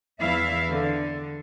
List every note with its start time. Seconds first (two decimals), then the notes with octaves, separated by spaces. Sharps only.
0.20 E2 E4 E5 F5
0.70 D3